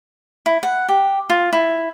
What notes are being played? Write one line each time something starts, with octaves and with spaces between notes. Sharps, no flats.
E4
F#5
G4
F4
E4